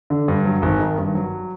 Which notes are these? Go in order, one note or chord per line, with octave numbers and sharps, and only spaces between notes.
D3
G2
F#3
G#1
D#3
G2
F#3